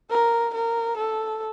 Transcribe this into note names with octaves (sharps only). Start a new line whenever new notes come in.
A#4
A#4
A4